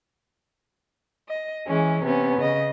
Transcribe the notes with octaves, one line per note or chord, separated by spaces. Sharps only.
D#5
E3 G#3 C#4
C3 B3 C#4
C#3 D#5